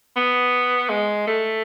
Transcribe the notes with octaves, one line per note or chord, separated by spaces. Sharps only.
B3
G#3
A3